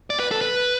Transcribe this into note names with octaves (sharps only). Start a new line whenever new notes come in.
D5
B4
A4
B4